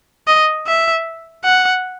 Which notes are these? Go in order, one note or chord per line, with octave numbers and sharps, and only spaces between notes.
D#5
E5
F#5